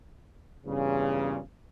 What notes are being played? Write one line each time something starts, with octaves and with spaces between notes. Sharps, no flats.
E2 G2 A#2 C#3